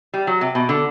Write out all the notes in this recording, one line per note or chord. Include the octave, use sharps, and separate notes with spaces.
G3
F#3
C3
B2
D3